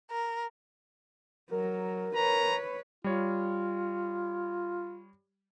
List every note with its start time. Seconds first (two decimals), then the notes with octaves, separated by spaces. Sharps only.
0.11 A#4
1.51 F#3 A#4
2.16 B4 C#5 A#5
3.04 G3 F4 C#5